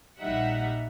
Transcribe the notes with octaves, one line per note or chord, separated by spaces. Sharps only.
A#1 G3 D#4 E5 F#5